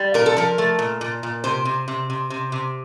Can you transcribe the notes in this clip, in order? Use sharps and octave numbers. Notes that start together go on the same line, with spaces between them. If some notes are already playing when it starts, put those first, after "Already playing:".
Already playing: G3
A#2 A#4
A4
F3 A#4
A3
A#2
A#2
A#2
C3 C5
C3
C3
C3
C3
C3